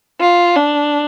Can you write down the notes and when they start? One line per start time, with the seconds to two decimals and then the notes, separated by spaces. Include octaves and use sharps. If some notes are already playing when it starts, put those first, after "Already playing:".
0.20 F4
0.56 D4